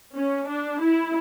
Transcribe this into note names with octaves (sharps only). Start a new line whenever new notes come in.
C#4
D4
E4